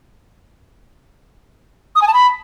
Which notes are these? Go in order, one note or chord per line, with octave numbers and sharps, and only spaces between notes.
D#6
G#5
A5
B5